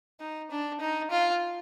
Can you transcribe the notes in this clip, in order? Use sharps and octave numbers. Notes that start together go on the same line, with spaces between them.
D#4
D4
D#4
F4